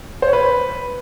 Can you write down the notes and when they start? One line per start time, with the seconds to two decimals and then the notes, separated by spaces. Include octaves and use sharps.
0.22 C5
0.28 C#5
0.33 B4